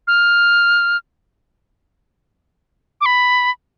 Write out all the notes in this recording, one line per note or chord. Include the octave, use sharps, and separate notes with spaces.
F6
D6
B5